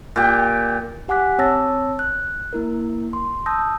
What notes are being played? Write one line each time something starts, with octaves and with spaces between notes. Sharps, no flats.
A#2 G4
G4 F#5 G#5 D6 F#6 B6
C4 C#5 A5 E6 A6 A#6
F#6
A#3 E4 A#4
C6
A5 D#6 E6 G6 A#6